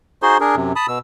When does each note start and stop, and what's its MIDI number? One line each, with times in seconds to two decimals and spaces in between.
0.22 0.37 63
0.22 0.37 66
0.22 0.37 68
0.22 0.37 72
0.22 0.37 84
0.40 0.56 62
0.40 0.56 68
0.40 0.56 70
0.56 0.73 42
0.56 0.73 48
0.76 0.86 81
0.76 0.86 83
0.76 0.86 87
0.88 0.99 47
0.88 0.99 88